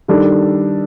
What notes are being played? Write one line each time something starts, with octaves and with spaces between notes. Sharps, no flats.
D#3 G3 D4 A4